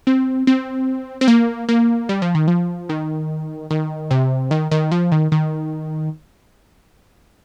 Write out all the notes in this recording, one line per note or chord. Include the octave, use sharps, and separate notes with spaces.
C4
C4
C4
A#3
A#3
G3
F3
D#3
F3
D#3
D#3
C3
D#3
D#3
F3
D#3
D#3